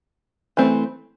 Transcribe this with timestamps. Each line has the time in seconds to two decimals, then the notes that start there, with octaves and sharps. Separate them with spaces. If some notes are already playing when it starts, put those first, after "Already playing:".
0.57 E3 A3 C4